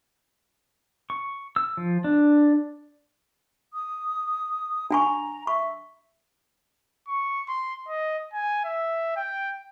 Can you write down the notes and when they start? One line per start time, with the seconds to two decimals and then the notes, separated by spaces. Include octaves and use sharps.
1.10 C#6
1.56 E6
1.77 F3
2.04 D4
3.74 D#6
4.91 D4 G#5 A#5 C#6
5.47 E5 C#6
7.08 C#6
7.49 C6
7.88 D#5
8.34 G#5
8.65 E5
9.16 G5